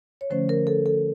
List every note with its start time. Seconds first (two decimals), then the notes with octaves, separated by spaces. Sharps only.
0.21 C#5
0.30 D3 F3 A3 C#4 C5
0.49 A#4
0.67 A4
0.86 A4